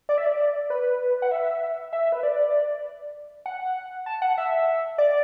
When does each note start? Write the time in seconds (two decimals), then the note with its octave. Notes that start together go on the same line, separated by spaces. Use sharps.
0.09 D5
0.18 E5
0.27 D5
0.70 B4
1.22 F#5
1.31 E5
1.93 E5
2.12 B4
2.23 D5
3.46 F#5
4.06 A5
4.22 F#5
4.38 E5
4.98 D5